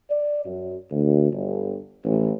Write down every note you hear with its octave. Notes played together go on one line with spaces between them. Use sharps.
D5
F#2
D2
G1
A1